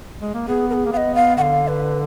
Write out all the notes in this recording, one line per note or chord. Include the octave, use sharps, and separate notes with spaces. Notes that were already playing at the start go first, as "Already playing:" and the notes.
G#3
A#3
B3 G#4
A#4
G#4
A#3
B3 F5
D#5
F5
D3 F5 F#5
B4